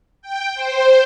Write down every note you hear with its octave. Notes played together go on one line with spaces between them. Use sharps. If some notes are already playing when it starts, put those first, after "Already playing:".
G5
C5